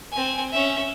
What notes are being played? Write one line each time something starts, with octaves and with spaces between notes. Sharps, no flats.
C4 G#5
C#4 E5